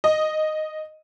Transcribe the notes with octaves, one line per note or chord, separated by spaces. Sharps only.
D#5